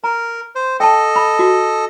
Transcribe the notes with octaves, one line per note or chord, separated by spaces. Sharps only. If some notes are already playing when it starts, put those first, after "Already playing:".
A#4 A#5
C5
A4 D#5 G5 A5
B5
F#4